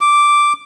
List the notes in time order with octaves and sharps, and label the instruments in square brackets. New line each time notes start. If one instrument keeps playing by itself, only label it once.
[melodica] D6